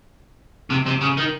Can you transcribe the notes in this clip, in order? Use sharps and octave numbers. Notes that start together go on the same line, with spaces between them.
C3
C3
C#3
D#3